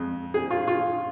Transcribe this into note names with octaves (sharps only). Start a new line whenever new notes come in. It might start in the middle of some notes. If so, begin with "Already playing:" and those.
Already playing: F2 G#3
G#4
F4
F4